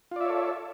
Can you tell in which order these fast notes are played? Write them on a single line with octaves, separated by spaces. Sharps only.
F4 D5 E5 C#5 A4